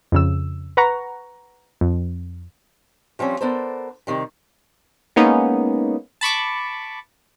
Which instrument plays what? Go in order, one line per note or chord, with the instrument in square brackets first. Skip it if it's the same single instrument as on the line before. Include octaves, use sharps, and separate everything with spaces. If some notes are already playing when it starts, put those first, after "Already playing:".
[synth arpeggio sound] F2 C#3 E6
B4 F#5 A#5 C#6
F2
[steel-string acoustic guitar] F3 G3 C4 C#4
B3 D4 A4 A#4 C5
C3 D#3 G3
[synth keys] G#3 A#3 B3 C#4 D#4
A5 B5 C#6 D6